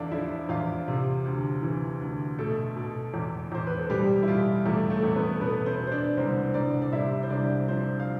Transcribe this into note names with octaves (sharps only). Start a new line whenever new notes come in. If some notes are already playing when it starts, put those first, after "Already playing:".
Already playing: E2 D3 D4 A4 D5 E5 F5 A5
F3 E4 E5
E2 F4 F5
C3
D2
E3
D2
B2 A3 A4
B2
E2
E2 C5
B4
A4
B2 G3 G4
E4
B2 F4
E2 A3 A4
A3 A4
E2 A4
B3 B4
A4
B2 B3 B4
C4 C5
B2
C5
D4 D5
C2 C4 C5
C2 D4 D5
D5
C3 E4 E5
C5
C2 D4 D5
F3 C4 C5
F5